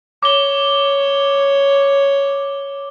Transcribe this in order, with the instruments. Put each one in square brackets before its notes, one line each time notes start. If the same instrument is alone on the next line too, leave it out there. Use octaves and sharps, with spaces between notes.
[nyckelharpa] C#5 [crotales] D6 G7